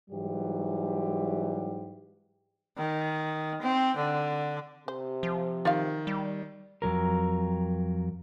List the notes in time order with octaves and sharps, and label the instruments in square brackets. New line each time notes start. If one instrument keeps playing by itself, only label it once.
[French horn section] G#2 E3 F#3 G3 G4
[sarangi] D#3
C4
D3
[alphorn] C3 [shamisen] C5
[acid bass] F3
[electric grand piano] D#3 [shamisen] F4 G4 F5
[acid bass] G3
[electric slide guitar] F2 A#2 F#3 A#4